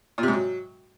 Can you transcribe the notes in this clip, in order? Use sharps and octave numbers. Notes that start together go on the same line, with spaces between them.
A#2
C3
G#2
F#3